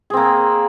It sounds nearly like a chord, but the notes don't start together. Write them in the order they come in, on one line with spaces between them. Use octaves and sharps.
G#4 C4 A#3